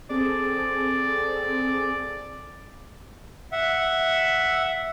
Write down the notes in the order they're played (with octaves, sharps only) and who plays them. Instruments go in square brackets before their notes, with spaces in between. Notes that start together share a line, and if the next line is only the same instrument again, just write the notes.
[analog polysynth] C4 G#4 A4 [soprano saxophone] D5
[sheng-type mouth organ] E5 F#5